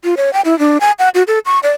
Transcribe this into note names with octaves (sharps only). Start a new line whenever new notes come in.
F4
C#5
G5
E4
D4
G#5
F#5
F#4
A4
C#6
D5